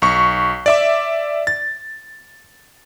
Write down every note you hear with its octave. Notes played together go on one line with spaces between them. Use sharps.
B1 C#6
D5 E5 D6
A6